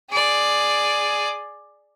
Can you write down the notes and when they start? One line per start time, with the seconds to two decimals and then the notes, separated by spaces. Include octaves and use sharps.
0.10 G#4 D5